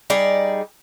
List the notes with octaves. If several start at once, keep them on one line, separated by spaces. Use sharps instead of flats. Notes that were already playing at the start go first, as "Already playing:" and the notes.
G3 D#4 G#4 D5